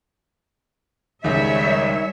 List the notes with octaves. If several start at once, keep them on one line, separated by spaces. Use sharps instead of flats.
C#2 G#2 D#3 G3 C#5 E5